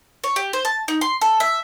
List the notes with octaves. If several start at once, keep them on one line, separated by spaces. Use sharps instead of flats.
C#5
G4
C5
A5
D#4
C6
A4
E5